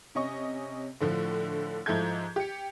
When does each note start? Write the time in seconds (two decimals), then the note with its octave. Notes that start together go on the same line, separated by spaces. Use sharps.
0.15 C3 C#4 D#5 C#6
1.01 A2 D3 F3
1.86 G#2 F3 E4 A4 G6 G#6
2.36 G4 C#7